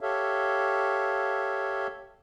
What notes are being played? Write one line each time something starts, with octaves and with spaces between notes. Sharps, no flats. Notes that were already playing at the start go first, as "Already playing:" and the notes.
G4 A4 C#5 E5 F5